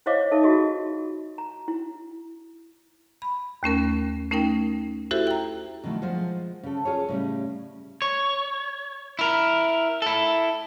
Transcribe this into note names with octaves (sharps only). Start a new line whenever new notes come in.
E4 C5 C#5 D#5 F5 D6
D#4 A4 E5
F4 F#4 G#4 D#5
A#5
E4
B5
D#2 A3 C#4 A#4
A3 C#4 D#4 A#4 G5
E4 F#4 G4 A4 C5 E5
G5 A#5
B2 D3 D#3 F3 A3
F3 G#3 F4 A#4 C5 F#5
C#3 A4
F4 G#4 A#4 C#5
A2 C#3 G3
C#5
E4 A#4
E4 A4